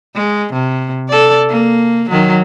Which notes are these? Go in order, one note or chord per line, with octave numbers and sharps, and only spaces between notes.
G#3
C3
A4 D5
A#3
D#3 F#3